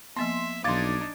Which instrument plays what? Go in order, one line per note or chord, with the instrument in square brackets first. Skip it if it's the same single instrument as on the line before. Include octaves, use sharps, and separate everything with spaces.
[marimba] F3 A#3 B3 [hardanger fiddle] E5 [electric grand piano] C6
[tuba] B1 [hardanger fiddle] D4 D#4 [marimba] F5 C6 [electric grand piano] D6 G#6 A6